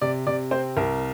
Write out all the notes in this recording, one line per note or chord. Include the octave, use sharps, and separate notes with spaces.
C3 D5
C3 D5
C4 C5
C2 A#4